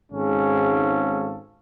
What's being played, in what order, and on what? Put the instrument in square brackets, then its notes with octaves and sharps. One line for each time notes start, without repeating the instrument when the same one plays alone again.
[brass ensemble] G#1 G#2 G#3 C#4 A4 F5